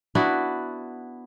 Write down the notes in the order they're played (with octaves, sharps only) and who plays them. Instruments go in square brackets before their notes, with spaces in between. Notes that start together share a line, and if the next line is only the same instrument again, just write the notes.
[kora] B3 D4 E4 F#4